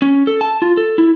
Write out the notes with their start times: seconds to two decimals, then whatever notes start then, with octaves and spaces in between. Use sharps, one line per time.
0.02 C#4
0.27 A4
0.41 A5
0.62 F4
0.77 A4
0.98 E4